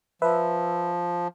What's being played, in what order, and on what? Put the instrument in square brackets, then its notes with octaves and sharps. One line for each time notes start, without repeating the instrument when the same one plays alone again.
[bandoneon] F3 [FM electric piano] B4 E5